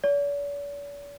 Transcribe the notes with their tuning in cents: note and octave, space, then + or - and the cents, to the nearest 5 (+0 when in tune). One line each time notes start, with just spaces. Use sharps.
D5 -45